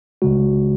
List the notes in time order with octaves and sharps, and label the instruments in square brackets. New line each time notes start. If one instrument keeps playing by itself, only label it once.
[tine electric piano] C#2 C#3 G#3 F#4